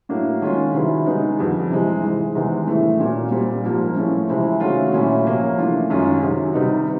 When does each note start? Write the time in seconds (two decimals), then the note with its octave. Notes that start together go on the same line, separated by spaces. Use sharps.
0.09 A2 F#3 A#3 D4
0.41 D#3 G#3 C#4 F4
0.73 C3 D#3 F#3 B3 E4
1.06 D#3 G#3 B3 D#4
1.38 F2 D3 G3
1.70 C3 E3 G#3 C4
2.03 G#2 E3 G#3
2.35 E2 C3 D#3 G#3 C4
2.67 A2 E3 A3
3.00 A#2 F#3 A#3
3.31 A#2 G3 C4
3.64 G#2 F3 A#3
3.96 A2 F3 A3 C#4
4.29 C3 E3 G#3 C4 E4
4.60 D#3 F#3 A3 C#4 F4
4.93 A#2 F#3 A3 C#4 E4
5.25 C3 F3 A#3 C#4
5.58 E3 A3 D4 F4
5.90 F#2 D#3 G#3 C#4 F4
6.22 C3 D#3 F#3
6.54 C3 D#3 G3 B3 D#4